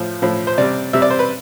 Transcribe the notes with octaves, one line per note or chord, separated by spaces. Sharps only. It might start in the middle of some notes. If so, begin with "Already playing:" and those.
Already playing: A2 F3
A2 F3
C5
C3 G3 D5
C3 G3 E5
D5
C5
B4